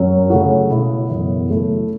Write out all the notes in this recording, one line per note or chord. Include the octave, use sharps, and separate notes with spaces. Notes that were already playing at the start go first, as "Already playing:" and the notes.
Already playing: F#2 F#3 C#4
C#3 A3 F#4
B2 B3 E4
F#2 C#3 E3 B3 E4
C#3 F#3 A3 E4